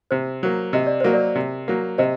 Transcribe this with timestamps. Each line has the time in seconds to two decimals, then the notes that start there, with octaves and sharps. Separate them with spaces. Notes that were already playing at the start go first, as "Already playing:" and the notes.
0.11 C3 C5
0.43 F#3 A#3
0.73 C3 D#5
0.87 D5
1.00 F#3 A#3 C5
1.13 A#4 D5
1.35 C3
1.68 F#3 A#3
1.98 C3 C5 D#5